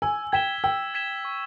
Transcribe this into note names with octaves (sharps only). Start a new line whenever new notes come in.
G#5 E6
G5 G#6 B6 E7 G7
G5 E6
G#6 B6 E7 G7
C#6